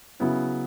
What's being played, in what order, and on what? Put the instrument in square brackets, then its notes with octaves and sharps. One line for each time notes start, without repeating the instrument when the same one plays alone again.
[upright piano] C#3 F#3 B3 E4